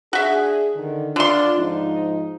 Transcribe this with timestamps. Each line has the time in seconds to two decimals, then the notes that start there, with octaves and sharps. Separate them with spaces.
0.13 D4 F#4 G#4 E5
0.76 D3 D#3
1.16 D3 D4 F4 C6
1.58 G#2 F3 D#4